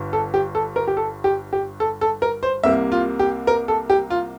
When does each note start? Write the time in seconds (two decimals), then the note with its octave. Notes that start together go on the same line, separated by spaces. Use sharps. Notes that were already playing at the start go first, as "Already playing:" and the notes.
Already playing: G1 G2
0.13 A4
0.34 G4
0.55 A4
0.76 A#4
0.88 G4
0.97 A4
1.24 G4
1.53 G4
1.80 A4
2.01 A4
2.22 A#4
2.43 C5
2.63 C2 C3 G3 A#3 E5
2.92 F4
3.19 G4
3.47 A#4
3.68 A4
3.90 G4
4.10 F4